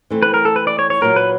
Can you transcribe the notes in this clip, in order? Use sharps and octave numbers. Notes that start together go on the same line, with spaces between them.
E3 A3 C4 E4
B4
A#4
A4
B4
D5
C#5
C#5
A#2 F#3 A#3 A#4
B4